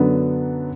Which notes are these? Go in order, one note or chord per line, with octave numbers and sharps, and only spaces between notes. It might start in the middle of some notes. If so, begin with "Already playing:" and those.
Already playing: F#2 D3 F#3 B3